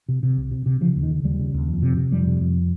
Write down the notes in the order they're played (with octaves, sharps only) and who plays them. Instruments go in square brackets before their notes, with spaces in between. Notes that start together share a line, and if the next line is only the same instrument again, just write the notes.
[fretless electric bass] C3
C3
C2
C3
C3
C#3 F3
D#2
D#3
C#3
D#2 G3
C#3
D#2
F2
C3
C3
F2 G3
C3
F2